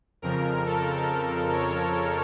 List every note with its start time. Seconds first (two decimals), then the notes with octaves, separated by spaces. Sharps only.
0.22 F2 C#3 F3 A#4
0.66 A4
1.52 C#5